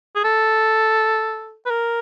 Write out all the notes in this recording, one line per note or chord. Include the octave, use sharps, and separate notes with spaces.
G#4
A4
B4
A#4